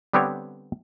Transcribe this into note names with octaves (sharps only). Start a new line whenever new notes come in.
D3 G3 B3 C4 G4 C#5